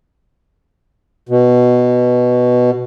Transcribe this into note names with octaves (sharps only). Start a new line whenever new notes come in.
B2